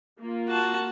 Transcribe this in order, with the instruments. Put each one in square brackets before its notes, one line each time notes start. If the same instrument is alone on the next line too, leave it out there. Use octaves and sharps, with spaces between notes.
[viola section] A#3 F4
[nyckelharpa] F#4 A5